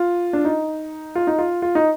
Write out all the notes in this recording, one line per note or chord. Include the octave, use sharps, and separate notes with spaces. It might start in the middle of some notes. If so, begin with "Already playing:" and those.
Already playing: F4
D4
D#4
F4
D#4
F4
F4
D#4